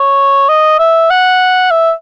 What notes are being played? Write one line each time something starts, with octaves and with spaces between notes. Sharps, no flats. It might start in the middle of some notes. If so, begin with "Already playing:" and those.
Already playing: C#5
D#5
E5
F#5
E5